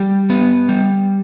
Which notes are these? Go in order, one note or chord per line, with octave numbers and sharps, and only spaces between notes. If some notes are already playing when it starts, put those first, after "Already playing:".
Already playing: G3 G4
B3
G3